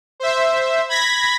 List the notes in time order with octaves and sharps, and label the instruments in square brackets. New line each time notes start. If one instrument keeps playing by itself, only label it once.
[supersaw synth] C5 E5
B5 G#6 A#6 B6